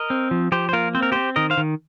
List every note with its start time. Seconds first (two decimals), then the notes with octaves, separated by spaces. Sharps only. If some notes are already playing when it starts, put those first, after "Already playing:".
Already playing: A#4 D#5
0.10 C4
0.31 F3
0.52 F3 G4 C5
0.69 C5
0.73 A#3 F4 A#4
0.95 C4 C5
1.03 A#4
1.12 C4 G4 C5
1.36 D#3 A#4 D#5
1.50 C5 F5
1.57 D#3